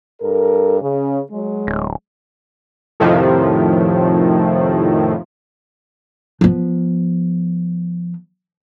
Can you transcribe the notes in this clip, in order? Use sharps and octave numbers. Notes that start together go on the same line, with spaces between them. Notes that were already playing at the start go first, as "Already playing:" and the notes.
G2 A4 A#4
C#3 C#4
F#3 G#3
D1
F2 A2 C3 D#3 F3
F3 B3